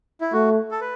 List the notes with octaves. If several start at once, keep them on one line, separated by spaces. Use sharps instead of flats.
E4
A3 F#4
A4
B4